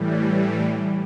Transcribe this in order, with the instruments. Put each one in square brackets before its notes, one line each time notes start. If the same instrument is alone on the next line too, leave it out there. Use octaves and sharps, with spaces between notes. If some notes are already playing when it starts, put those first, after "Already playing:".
Already playing: [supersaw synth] A2 E3 G3